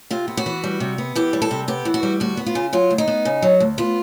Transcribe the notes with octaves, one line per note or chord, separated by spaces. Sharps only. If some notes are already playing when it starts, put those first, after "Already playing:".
C3 F4
B3
F#4
E3
G3
C3
B3
E3 G4
G3
A4
C3
B3 G4
E3
F#4
G3
D2 F#4
B3
F4
C#3
F#3 F4
D2
D#4
B3
C#3
F#3
D2
B3 F4